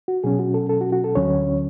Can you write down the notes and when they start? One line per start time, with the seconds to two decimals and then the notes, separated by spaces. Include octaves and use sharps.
0.08 F#4
0.24 B2 F#3 C#4 G#4
0.39 F#4
0.54 A4
0.69 A4
0.81 F#4
0.92 F#4
1.04 A4
1.15 D2 D3 F#3 C#4 C#5